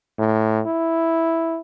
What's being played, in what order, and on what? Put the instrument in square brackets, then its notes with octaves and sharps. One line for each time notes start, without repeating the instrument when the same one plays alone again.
[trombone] A2
E4